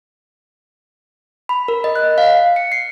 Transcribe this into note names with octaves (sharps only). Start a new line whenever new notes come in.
B5
A#4
D#5
F#6
F5
C#7
C7